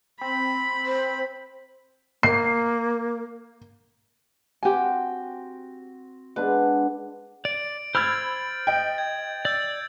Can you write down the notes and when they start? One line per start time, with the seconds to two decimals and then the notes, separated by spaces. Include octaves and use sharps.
0.21 C4 B5
0.86 C5
2.23 A#3 C7
4.63 C4 F#4 G4 G#5
6.36 G#3 B3 D4 B4
7.45 D5 D7
7.95 C5 B5 E6 F6 G#6 A6 F#7
8.67 D#5 G5
8.98 G#6
9.45 D5 E6 G6 A6